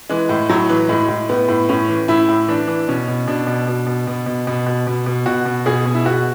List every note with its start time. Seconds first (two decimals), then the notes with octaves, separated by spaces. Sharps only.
0.09 E3 G#3
0.29 A2
0.49 A2 F#3
0.70 E3
0.89 A2 G#3
1.09 A2
1.29 A2 B3
1.49 A2
1.69 A2 C#4
1.89 E3
2.08 A2 E4
2.29 A2
2.48 E3 D4
2.68 E3
2.88 B2 C#4
3.08 B2
3.28 B2 D4
3.47 B2
3.67 B2
3.87 B2
4.07 B2
4.26 B2
4.47 B2
4.66 B2
4.87 B2
5.06 B2
5.26 B2 F#4
5.45 B2
5.66 B2 G#4
5.86 B2
5.94 E4
6.05 B2 F#4